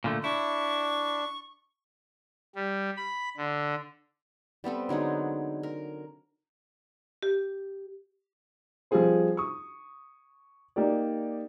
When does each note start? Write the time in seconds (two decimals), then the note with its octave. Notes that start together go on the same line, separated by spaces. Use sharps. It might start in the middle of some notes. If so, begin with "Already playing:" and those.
0.04 A#2 D3 A3
0.24 D4 E4 C#6
2.55 G3
2.97 B5
3.37 D3
4.64 G3 B3 C4 A4
4.89 D3 F#3 G#3 D#4
5.63 A#4
7.23 G4
8.91 F3 G3 C4 F4 G#4 C5
9.37 C#6 D#6
10.76 A#3 D#4 G4 D5